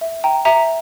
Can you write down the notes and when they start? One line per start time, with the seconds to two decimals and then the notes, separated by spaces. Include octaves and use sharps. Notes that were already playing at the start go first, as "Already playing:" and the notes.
0.01 E5
0.24 G5 A#5
0.45 E5 A#5